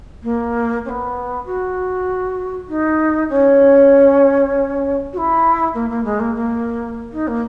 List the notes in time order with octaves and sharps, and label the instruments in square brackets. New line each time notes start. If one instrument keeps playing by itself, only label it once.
[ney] A#3
C#4
B3
F#4
D#4
C#4
F#4
E4
A#3
A#3
G#3
A#3
A#3
D#4
A#3